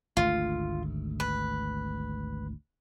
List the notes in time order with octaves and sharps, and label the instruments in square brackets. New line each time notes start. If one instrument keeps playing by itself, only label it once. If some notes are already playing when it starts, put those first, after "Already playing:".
[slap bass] G#1 D2 A3 [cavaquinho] F4
[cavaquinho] B4